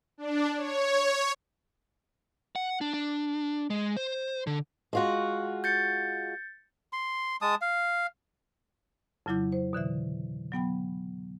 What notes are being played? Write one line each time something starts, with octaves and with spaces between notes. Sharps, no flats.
D4
C#5
F#5
D4
D4
G#3
C5
D3
G#3 F4 F#4
G6 A6 C#7
C6
G#3 A5 D#6
F5
F2 C#3 F#3 E4 D6 G6
C5
B2 D3 E3 E5
F#3 B3 G5 B5